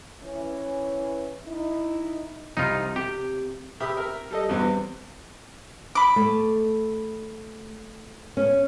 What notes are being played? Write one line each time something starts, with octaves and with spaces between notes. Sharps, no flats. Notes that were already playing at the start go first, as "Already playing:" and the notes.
E3 C#4
D#4 E4
C2 D#4 F4
C3 G4
C3 G4 E5 B5 D#6
A#4 E5
G3 A4 D#5
E2 G2 B2 G3 B3 C4
B5 D6
A3
C#4